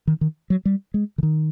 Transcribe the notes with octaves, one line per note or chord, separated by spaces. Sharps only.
D#3
D#3
F#3
G3
G#3
D3
D#3